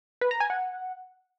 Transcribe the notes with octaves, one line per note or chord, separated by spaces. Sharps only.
B4
A#5
G#5
F#5